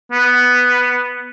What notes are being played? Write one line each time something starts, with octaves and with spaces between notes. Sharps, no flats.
B3